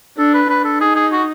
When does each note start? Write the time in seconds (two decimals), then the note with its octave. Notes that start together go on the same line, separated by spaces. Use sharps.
0.18 D4 A4
0.34 B4
0.49 D4 B4
0.65 A4
0.81 D#4 G#4
0.96 G#4
1.12 F#4